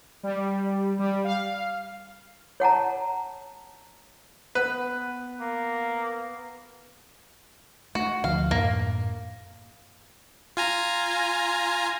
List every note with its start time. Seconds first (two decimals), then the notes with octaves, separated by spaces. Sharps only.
0.23 G3
0.99 G3
1.24 F5
2.60 C#5 F#5 A5 A#5
4.55 B3 B4
5.41 A#3
7.95 A3 F#4
8.24 D2 F3 F5
8.51 F#2 A2 A#3
10.57 F4 G#5 A#5